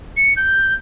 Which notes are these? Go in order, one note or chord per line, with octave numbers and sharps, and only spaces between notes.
C#7
G6